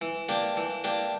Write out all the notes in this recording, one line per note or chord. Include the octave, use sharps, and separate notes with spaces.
E3
A#3 D4 G4
E3
A#3 D4 G4